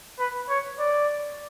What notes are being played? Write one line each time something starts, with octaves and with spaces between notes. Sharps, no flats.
B4
C#5
D5